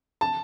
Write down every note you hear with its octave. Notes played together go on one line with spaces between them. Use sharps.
A5